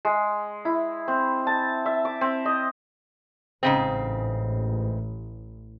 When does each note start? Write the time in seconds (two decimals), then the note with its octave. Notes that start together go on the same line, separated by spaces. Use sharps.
0.05 G#3
0.65 E4
1.08 C4
1.47 A5
1.86 E5
2.05 D6
2.21 C4
2.45 D#5
3.63 A1 G#2 C#3 C4